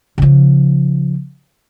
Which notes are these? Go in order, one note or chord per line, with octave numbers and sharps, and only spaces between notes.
C#3 F3